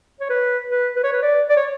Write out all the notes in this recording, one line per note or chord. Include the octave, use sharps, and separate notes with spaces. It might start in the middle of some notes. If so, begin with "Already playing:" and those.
C#5
B4
B4
B4
C#5
B4
D5
D5
C#5